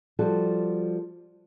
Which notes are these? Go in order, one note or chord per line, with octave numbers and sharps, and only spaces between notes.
F3 G3 F#4 A4